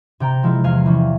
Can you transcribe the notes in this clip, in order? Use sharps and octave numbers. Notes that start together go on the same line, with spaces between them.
C3 G5 A#5
F3 G#3 C4 E4
E2 F5 G#5
E3 G3 C#4